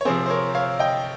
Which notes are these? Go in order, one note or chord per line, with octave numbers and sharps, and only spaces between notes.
C#5
C3 F3 C4 G#4 C5
C5
A#4 C#5
C#5 F5
D#5 G5